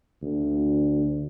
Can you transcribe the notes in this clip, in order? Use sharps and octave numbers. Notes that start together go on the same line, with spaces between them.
D2